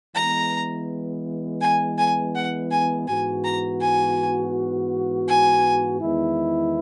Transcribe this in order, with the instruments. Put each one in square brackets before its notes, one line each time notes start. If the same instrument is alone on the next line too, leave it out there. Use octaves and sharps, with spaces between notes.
[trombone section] E3 G#3 B3 [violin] A#5
[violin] G#5
G#5
F#5
G#5
[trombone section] G#2 E3 B3 F#4 [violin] G#5
[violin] A#5
G#5
G#5
[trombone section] E2 D#3 G#3 B3 E4